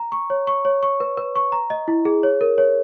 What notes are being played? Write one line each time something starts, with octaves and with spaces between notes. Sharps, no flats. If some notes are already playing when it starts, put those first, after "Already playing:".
Already playing: A#5
C#6
C#5
C#6
C#5
C#6
B4
B4
C#6
A#5
D#5
E4
G#4
C#5
A#4
C#5